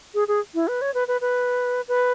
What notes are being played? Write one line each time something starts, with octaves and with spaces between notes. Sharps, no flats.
G#4
G#4
E4
B4
C#5
B4
B4
B4
B4